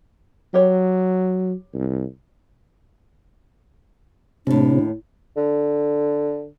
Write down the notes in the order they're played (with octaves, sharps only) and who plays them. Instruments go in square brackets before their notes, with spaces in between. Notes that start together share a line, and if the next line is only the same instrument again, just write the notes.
[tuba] F#3 [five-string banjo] G4 C#5
[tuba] C2
[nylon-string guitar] D#2 A2 [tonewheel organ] C3 [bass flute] D4
[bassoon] D3